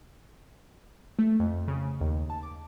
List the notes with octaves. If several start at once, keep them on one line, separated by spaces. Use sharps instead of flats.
A3
F2
C#3
D#2
A5
D6